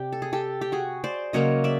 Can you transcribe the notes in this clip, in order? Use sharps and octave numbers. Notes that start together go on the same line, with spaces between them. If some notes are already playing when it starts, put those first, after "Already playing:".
Already playing: C3 G4 D5
A4
G#4
G4 A4
G4
F#4 G#4
C5 D5
C#3 F#3 A#3 C#5 D#5
D5 E5